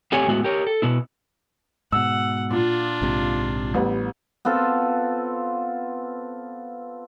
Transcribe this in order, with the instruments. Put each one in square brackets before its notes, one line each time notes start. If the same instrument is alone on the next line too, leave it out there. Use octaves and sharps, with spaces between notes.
[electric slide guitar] A3 C4 G4 C#5 F#5 G#5
A2 G#3 B3 F#4 E5
G4 A#4 C#5
A4
B2 B3 E4
[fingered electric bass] G#2 B2 [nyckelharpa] F#5 [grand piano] E6
[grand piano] A#2 [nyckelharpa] D4 F4
[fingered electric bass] A#1 G#2 C3
[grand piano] A1 G3 B3
[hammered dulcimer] B3 C4 F4 A4